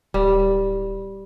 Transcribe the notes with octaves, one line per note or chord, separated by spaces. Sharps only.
D1 G3